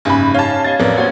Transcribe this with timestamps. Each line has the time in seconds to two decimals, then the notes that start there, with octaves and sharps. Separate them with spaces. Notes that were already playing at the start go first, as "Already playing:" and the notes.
0.05 F#1 G#2 C#4 G#5 B5
0.34 C#5 F5 A5
0.64 C#5 D#5 F5 A6
0.80 A1 F2 A#4 B4 D5
0.97 A#3 F#4 C5 C#5 F#5